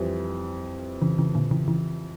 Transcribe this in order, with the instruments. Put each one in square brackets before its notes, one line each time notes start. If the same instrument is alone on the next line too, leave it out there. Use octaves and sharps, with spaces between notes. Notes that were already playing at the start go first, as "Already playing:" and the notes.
Already playing: [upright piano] F2 E3 G3
[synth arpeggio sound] C#3 E3
C#3 E3
A#2 D3
C#3 E3
C#3 E3